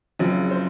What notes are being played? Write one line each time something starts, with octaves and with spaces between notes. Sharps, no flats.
F#1 F#2 C#3 F3 C4
C5